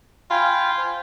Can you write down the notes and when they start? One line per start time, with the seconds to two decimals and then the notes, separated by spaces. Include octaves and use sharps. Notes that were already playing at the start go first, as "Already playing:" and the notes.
0.31 F4 G5 G#5 B5
0.78 C5